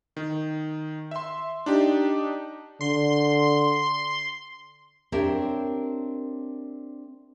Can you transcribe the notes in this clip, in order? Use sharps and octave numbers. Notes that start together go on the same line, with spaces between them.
D#3
E5 C6
D4 D#4 G4
D3 C6
C4 D4 G4 A#4 C#5 E5